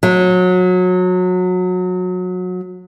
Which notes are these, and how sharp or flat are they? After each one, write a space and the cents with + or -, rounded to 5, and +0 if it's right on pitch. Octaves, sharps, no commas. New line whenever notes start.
F#3 -25